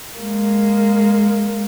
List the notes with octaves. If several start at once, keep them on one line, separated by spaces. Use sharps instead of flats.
G#3 A#3